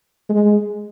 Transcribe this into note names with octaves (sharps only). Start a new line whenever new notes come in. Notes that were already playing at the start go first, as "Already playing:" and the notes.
G#3